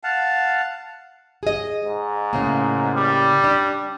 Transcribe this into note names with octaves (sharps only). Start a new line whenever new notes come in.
F5 F#5 A5
G#4 D#5
G#2
A2 C#3 A#3
G3
D4